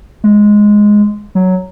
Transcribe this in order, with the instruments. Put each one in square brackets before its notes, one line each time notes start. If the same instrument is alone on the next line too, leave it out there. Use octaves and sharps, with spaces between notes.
[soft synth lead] G#3
F#3